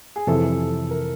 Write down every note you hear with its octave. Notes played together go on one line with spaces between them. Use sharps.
G#4
F2 C3 E3 A4
A#4